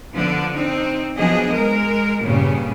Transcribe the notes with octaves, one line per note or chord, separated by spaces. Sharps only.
D3 F3 B3 D4
C4 D4 D#4
F3 F#3 B3 D4 G#4 D#5
G#3 A#4
G2 A#2 C#3 G3 B3 C#4